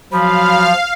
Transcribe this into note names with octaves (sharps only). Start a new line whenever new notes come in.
F3 F#3 F5 B5